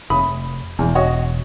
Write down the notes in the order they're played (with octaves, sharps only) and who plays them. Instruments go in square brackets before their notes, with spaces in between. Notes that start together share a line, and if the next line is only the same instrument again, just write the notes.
[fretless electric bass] F1 [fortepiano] B5 D#6
[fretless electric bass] E1 [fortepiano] E2
[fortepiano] F#4 C#5 D#5